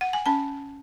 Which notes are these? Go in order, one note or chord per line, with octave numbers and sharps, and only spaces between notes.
F#5
G#5
C#4 A5